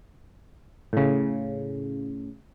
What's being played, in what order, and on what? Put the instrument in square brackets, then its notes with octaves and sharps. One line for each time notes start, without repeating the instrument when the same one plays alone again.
[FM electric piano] A2 C#3